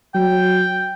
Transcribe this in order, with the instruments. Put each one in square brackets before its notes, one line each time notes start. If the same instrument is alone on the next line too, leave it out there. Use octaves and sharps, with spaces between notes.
[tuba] F#3 [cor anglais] G5